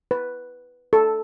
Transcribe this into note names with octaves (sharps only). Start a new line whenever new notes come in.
B4
A4